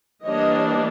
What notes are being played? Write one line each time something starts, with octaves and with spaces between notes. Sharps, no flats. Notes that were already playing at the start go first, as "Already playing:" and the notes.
E3 G3 A#3 D4 C#5 D#5